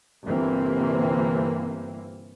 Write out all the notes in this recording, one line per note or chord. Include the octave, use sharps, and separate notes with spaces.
G1 C3 E3 A#3 C4